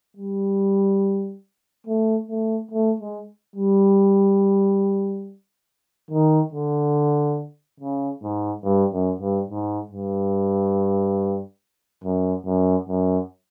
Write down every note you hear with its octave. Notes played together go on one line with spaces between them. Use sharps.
G3
A3
A3
A3
G#3
G3
D#3
D3
C#3
G#2
G2
F#2
G2
G#2
G2
F#2
F#2
F#2